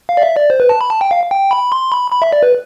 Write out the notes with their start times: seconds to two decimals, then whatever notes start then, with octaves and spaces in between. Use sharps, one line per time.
0.09 F5
0.17 D5
0.22 E5
0.36 D5
0.50 C5
0.60 B4
0.69 A5
0.81 B5
0.90 A5
1.01 G5
1.11 F5
1.31 G5
1.51 B5
1.72 C6
1.92 B5
2.12 B5
2.22 E5
2.33 D5
2.43 B4